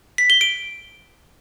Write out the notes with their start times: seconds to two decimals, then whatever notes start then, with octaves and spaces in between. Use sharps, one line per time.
0.18 B6
0.30 G7
0.41 D7